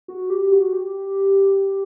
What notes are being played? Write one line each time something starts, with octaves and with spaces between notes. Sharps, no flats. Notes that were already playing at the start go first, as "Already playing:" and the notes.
F#4
G4
F#4
G4